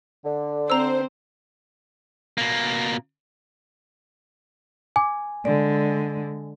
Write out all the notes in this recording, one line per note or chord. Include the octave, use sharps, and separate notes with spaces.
D3
C4 C5 A#5 E6
B2 A#3
G#5 D6
D3 G#3 D5